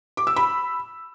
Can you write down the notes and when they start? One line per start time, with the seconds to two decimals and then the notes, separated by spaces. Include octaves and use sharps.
0.17 D6
0.27 E6
0.36 B5